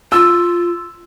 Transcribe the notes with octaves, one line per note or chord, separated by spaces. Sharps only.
F4 E6